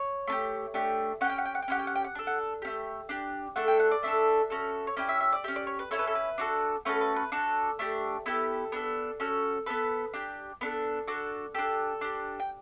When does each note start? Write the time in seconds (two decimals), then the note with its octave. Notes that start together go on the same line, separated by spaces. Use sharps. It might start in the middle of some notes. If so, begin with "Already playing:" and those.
Already playing: C#5
0.27 A3 D4 G4
0.74 A3 D4 G4
1.21 C#4 G4 F#5
1.29 G5
1.38 F#5
1.45 G5
1.55 F#5
1.62 G5
1.68 C#4 E4 G4 F#5
1.79 G5
1.87 F#5
1.96 G5
2.05 F#5
2.15 D4 A4
2.27 F#5
2.62 A3 C#4 G4
3.09 D4 G4
3.56 A3 D4 A4 F#5
3.68 G5
3.80 F#5
3.91 D5
4.03 A3 D4 A4 E5
4.50 C#4 F#4 A4
4.87 C#5
4.97 C#4 E4 G4 D5
5.09 E5
5.20 E5
5.33 D5
5.44 C#4 G4 E5
5.56 D5
5.67 C#5
5.79 B4
5.91 C#4 E4 A4 C#5
5.99 B4
6.07 A4
6.15 B4
6.38 D4 F#4 A4
6.85 A3 C#4 F#4 A4 B4
7.01 B4
7.16 B4
7.32 D4 F#4 A4
7.79 A3 D4 G4
8.26 B3 E4 G4 A4
8.72 B3 D4 A4
9.20 C#4 F#4 A4
9.66 B3 F#4 A4 B4
10.14 D4 G4
10.61 B3 D4 A4 B4
11.07 D4 F#4 A4
11.54 D4 G4 A4
12.01 D4 G4
12.40 G5